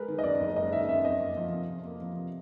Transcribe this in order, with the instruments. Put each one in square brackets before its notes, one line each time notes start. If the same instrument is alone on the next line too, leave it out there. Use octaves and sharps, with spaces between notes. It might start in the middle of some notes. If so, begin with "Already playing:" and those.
Already playing: [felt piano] G#3 [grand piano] A#4 B4
[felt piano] D#3
[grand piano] D#5
[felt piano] F#2 [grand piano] D5
[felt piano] F#1
[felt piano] G#3 [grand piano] D#5
[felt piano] D#3 [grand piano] E5
[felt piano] F#2 [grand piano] E5
[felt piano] F2 [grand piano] D#5
[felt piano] A#3
F3
C3
F2
A#3
F3
C3